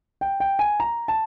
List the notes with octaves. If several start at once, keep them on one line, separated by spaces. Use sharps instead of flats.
G5
G5
G#5
A#5
A5